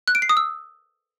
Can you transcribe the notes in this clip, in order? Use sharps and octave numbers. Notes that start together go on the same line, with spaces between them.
F#6
D7
C7
D#6
E6